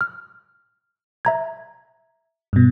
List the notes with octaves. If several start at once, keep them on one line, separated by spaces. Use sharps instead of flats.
F6
E5 A#5 G#6
G2 B2